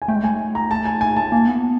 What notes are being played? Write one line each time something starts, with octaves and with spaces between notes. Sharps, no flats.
G#5
A3 G5
G#3
A3 G#5
A#5
A5
G#5
G#5
A5
A#3 G#5
B3